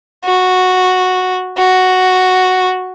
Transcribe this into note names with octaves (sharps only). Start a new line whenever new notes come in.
F#4
F#4